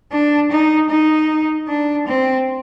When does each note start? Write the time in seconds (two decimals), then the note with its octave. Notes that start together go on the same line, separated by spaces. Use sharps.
0.12 D4
0.51 D#4
0.90 D#4
1.68 D4
2.07 C4